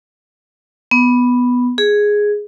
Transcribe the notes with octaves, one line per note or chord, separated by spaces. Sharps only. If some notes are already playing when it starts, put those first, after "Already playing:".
B3
G#4